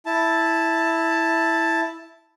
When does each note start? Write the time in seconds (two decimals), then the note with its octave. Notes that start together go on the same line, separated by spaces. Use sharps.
0.06 E4 A5